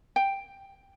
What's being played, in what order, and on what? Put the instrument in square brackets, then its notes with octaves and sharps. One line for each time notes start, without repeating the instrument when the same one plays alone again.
[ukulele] G5